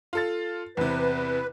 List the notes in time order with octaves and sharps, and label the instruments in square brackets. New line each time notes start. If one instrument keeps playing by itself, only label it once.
[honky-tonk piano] F4 A4 A6
[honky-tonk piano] E2 C3 [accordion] B4